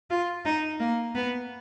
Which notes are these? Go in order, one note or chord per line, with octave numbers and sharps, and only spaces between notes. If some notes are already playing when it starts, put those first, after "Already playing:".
F4
D#4
A#3
B3